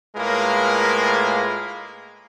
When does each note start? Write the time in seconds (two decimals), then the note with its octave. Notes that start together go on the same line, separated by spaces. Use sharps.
0.16 A2 G#3 A#3 F4 A#4 B4